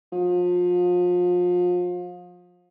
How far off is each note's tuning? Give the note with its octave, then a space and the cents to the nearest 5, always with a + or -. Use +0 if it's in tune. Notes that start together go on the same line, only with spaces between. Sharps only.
F3 +30